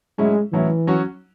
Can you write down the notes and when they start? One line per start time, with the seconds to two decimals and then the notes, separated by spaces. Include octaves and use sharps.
0.18 A2 F#3 G#3 C#4 E4
0.52 A2 E3 F#3 C#4 E4
0.87 F#3 C#4 F#4